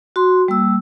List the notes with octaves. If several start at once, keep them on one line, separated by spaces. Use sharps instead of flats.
F#4 C6
G3 A#3 E6